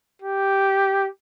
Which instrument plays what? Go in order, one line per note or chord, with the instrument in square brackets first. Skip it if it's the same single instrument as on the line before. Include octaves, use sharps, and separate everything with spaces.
[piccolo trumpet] G4